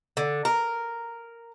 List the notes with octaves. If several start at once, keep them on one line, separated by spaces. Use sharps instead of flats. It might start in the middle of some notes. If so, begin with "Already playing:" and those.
D3
A#4